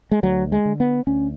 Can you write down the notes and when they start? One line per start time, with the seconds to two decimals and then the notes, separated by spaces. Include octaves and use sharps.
0.11 G#3
0.23 D2 F#3
0.52 G#3
0.65 D3
0.80 B3
1.07 D2 C#4